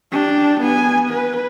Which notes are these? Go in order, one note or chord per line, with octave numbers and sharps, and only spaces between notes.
D4 G4
B3 G#5
B4